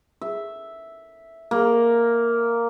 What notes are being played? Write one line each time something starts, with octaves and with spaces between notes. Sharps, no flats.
E5
A#3